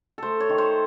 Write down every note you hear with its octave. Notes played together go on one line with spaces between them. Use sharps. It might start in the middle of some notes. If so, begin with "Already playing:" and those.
A3 A4 C5
C#5
D#3
C5